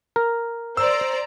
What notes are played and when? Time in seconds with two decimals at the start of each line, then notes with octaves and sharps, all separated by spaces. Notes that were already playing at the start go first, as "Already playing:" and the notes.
0.16 A#4
0.77 C5 D5 A#5 E6